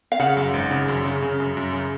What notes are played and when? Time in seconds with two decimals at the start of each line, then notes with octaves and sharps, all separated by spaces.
0.12 F5
0.20 C#3 F#5
0.37 F#2
0.54 G#1
0.71 C#3
0.88 F#2
1.05 C#3
1.22 C#3
1.40 F#2
1.57 F#2
1.73 C#3